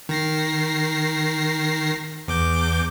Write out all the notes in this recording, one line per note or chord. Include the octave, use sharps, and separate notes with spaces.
D#3 A#6 C7
E2 D6 G6